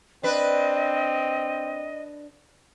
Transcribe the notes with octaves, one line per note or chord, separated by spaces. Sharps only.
C4 D4 B4 D#5